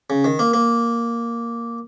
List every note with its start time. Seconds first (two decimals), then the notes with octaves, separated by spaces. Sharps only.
0.10 C#3
0.24 D#3
0.39 A#3
0.54 A#3